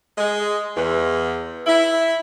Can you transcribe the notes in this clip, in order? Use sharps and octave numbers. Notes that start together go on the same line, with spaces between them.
G#3
E2
E4